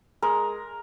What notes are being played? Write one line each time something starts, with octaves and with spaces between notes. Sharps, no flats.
G#3 A#4